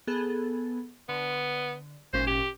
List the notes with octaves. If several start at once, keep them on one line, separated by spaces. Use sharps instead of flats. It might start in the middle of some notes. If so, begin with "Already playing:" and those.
B3 G#4 A4
D3 B3
G#1 A#2 C#4 C5
G4